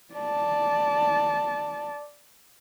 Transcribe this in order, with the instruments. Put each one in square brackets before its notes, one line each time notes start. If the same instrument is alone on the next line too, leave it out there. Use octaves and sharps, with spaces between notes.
[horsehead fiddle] D5 A5